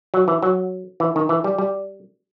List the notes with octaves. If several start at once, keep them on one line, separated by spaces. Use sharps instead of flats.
F#3
E3
F#3
E3
D#3
E3
G3
G3